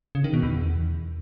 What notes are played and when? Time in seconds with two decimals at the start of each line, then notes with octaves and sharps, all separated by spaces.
0.15 C#3
0.24 D#3
0.34 B2
0.43 E2